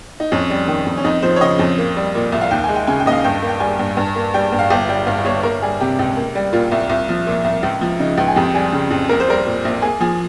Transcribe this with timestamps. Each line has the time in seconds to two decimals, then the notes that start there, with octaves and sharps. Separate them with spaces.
0.20 D#4
0.32 F2 C#4
0.50 G3
0.68 D#3
0.86 F2
0.97 C#4
1.04 F2 D#4
1.22 F3 C5
1.36 C#5
1.41 C#3 D#5
1.59 F2
1.78 A#3
1.96 G3
2.15 A#2
2.32 C2
2.41 F5
2.51 D#2 G5
2.64 G#3 G#5
2.76 G5
2.87 C#3 G#5
3.00 G5
3.06 D#2 D#5
3.12 F5
3.24 G2 G5
3.42 A#3
3.49 G5
3.60 G3 G#5
3.79 G2
3.97 G2
4.16 A#3
4.34 G3 G5
4.52 G2
4.59 F5
4.70 G1 G5
4.88 G3 G5
5.07 G2 F5
5.25 G1 C#5
5.43 A#3 A#4
5.62 G3 G#4
5.80 C3 G4
5.99 C#2
6.16 A#3
6.35 G3
6.53 A#2 F4
6.72 C2
6.90 C2
7.09 F3
7.26 A#2
7.45 C2
7.63 C#2
7.81 F3
7.99 C#3 D#4
8.18 C#2
8.28 G#4
8.36 F2 G4
8.54 G3 G#4
8.72 C#3
8.90 F2
9.09 A#3 A#4
9.20 C5
9.28 G3 A#4
9.46 A#2
9.65 A#1
9.82 A#3 G#4
10.01 F3 G#4